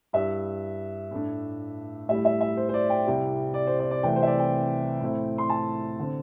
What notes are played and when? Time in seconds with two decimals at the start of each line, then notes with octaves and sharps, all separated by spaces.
0.13 G2 G3 E4 E5
1.11 A2 A3 D4
2.09 A2 G3 E4 E5
2.25 E5
2.41 E5
2.57 C5
2.69 C5
2.74 D5
2.90 G5
3.06 C2 C3 G3 E4
3.54 D5
3.67 C5
3.79 D5
3.91 D5
4.03 C2 C3 E3 A3 E4 G5
4.16 C5
4.22 E5
4.27 D5
4.39 G5
5.01 A2 A3 C4 E4
5.38 C6
5.49 A5
5.99 D3 C4